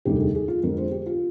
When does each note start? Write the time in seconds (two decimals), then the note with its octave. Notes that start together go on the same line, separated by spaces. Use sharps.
0.05 F1 D#2 D3 G3 G4
0.20 G#4
0.35 G#4
0.48 F4
0.63 F2 D3 G#3 A#4
0.78 C5
0.91 G4
1.06 F4